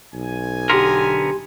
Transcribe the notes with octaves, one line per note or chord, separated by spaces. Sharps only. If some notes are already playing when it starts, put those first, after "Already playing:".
B1 G#5
D3 B3 G4 A#4 C6